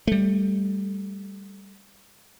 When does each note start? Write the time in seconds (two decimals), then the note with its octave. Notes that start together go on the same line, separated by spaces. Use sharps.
0.07 G3 A3